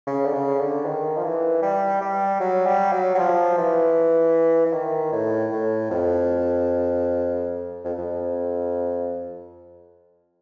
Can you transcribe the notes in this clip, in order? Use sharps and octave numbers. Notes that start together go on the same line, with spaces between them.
C#3
D3
C#3
D3
D#3
F3
E3
G3
G3
F#3
G3
F#3
F#3
F3
E3
E3
D#3
A2
A2
F2
F2
F2